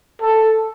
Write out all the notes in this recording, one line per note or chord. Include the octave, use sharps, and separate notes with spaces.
A4